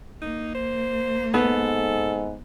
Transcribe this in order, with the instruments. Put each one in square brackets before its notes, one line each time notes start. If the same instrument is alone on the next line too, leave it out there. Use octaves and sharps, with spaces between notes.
[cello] A#3 [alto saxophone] D#4
[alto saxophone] C5
[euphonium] G#2 [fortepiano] B3 [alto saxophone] A4